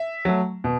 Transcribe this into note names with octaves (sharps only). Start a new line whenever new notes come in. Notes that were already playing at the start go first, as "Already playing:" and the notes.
Already playing: E5
F#3 A3
B2